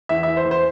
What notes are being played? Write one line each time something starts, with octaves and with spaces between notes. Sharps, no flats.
E2 E5
E3 E5
C5
E2
C5